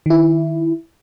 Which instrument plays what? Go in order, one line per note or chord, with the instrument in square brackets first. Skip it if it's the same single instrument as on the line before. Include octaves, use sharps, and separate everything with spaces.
[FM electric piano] D#3 E4